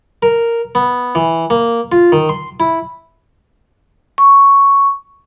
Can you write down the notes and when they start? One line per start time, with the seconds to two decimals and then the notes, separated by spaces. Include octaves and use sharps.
0.23 A#4
0.75 B3
1.15 E3
1.50 A#3
1.92 F4
2.12 D#3
2.29 C6
2.60 E4
4.18 C#6